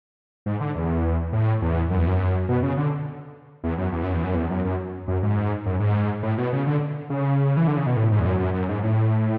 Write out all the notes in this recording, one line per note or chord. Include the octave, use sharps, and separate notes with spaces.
G#2
D3
E2
A2
E2
F#2
E2
F#2
B2
C#3
D3
E2
F#2
E2
F#2
E2
F#2
E2
F#2
F#2
F#2
G#2
F#2
G#2
A2
B2
C#3
D3
C#3
E3
D3
C#3
B2
A2
G#2
E2
F#2
F#2
F#2
G#2
A2